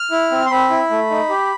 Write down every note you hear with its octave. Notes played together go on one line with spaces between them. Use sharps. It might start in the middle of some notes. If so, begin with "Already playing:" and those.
Already playing: F6
E4
C4
C6
C4 B5
E4
A3
D#4
G4